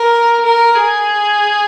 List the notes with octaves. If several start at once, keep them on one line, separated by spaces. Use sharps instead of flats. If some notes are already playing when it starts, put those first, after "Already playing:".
Already playing: A#4
A#4
G#4